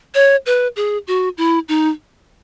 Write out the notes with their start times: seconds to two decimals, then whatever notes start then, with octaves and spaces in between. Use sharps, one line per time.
0.15 C#5
0.46 B4
0.76 G#4
1.07 F#4
1.38 E4
1.69 D#4